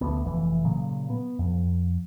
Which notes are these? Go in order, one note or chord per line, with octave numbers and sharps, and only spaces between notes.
D2 B3
F1 E3
A#2 C#3 F#3
B3
F2